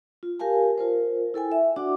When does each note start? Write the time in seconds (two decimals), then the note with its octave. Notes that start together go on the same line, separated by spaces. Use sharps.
0.23 F4
0.39 G4 A#4 F5 G#5 A5
0.78 F4 A#4 C5
1.34 E4 A4 G5 G#5
1.52 E5
1.76 D4 F#4 D5 F#5 D6